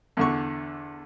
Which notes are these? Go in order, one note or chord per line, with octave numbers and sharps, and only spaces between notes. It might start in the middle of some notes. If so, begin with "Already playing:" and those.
E2 D3 C#6